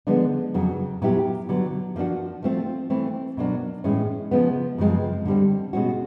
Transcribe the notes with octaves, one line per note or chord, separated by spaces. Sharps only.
D3 F3 G#3 B3 D4
F2 C#3 F#3
A#2 F#3 B3 E4 G4
D3 F#3 B3
F3 A#3 D4 F#4
F3 A3 C4 F4
E3 A3 C4
B2 F#3 A#3 D4
A2 E3 G#3 C#4
C#3 F3 G#3 B3
F#2 C#3 F3 G#3 C4
D3 G3 C4
B2 G#3 C#4 F#4